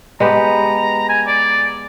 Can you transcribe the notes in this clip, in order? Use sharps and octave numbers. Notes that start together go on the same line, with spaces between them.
G#3 B3 G4 A#5
G#5
D5